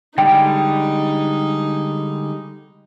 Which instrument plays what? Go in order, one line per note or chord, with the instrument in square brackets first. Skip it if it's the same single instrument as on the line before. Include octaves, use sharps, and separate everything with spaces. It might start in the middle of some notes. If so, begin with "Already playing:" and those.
[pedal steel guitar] D3 G3 G#3 [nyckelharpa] D#4 [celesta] G5